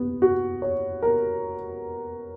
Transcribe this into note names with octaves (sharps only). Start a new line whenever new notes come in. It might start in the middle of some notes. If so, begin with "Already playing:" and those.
Already playing: B3
F#4
C#5
A#4